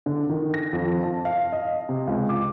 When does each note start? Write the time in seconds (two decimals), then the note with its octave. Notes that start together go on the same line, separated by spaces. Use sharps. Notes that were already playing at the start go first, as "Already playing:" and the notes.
0.06 D3
0.29 D#3
0.54 A#6
0.73 F2
1.03 A5
1.25 F5
1.53 D#5
1.89 C3
2.07 C#2
2.29 D6